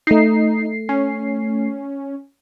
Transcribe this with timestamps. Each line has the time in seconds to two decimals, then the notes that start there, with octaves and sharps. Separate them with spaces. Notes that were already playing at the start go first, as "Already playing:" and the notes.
0.07 A3 D#4 C7
0.89 C#4